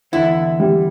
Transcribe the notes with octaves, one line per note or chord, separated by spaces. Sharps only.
E2 D3 E4 F#5
G3